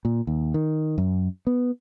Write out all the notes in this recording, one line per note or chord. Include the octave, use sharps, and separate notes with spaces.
A#2
D#2
D#3
F#2
B3